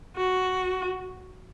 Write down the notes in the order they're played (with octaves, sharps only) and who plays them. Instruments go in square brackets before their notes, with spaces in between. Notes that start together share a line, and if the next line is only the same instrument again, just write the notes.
[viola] F#4